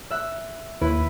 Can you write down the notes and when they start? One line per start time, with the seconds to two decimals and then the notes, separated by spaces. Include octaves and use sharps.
0.11 E5 F#6
0.81 D#2 E4 B4